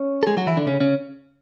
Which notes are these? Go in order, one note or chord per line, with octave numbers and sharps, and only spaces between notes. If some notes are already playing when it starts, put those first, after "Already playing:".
Already playing: C#4 C#5
A4
G#3 G#4
F#3 F#4
E3 E4
D3 D4
C#3 C#4
C#3 C#4